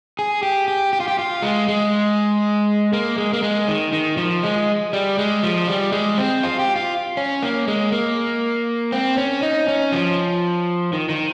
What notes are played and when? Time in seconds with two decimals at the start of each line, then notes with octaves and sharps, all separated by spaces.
0.19 G#4
0.43 G4
0.68 G4
0.93 G4
1.00 F4
1.08 G4
1.19 F4
1.42 G#3
1.68 G#3
2.93 A#3
3.18 G#3
3.33 A#3
3.43 G#3
3.68 D#3
3.93 D#3
4.17 F3
4.44 G#3
4.93 G3
5.18 G#3
5.43 F3
5.68 G3
5.92 G#3
6.18 C4
6.43 F4
6.59 G4
6.76 F4
7.17 C#4
7.43 A#3
7.68 G#3
7.92 A#3
8.92 C4
9.18 C#4
9.43 D#4
9.68 C#4
9.92 F3
10.93 D#3
11.09 D#3